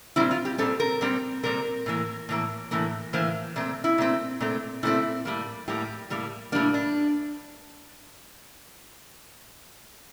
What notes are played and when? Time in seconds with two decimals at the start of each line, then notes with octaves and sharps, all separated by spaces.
0.16 A#2 G3 C4 E4
0.31 F4
0.45 G4
0.58 A#2 G3 C4 A4
0.80 A#4
1.01 A#2 G3 C4
1.43 A#2 G3 C4 A#4
1.86 A2 E3 A#3
2.29 A2 E3 A#3
2.71 A2 E3 A#3
3.13 A2 E3 A#3 C5
3.56 A#2 A3 C4
3.84 E4
3.98 A#2 A3 C4
4.40 A#2 A3 C4
4.83 A#2 A3 C4 E4
5.25 A2 G3 A#3
5.68 A2 G3 A#3 G4
6.10 A2 G3 A#3
6.52 A2 G3 A#3 D4
6.74 D4